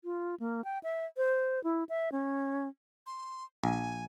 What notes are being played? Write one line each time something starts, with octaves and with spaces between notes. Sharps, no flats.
F4
A#3
G5
E5
C5
E4
E5
C#4
C6
A#1 G#5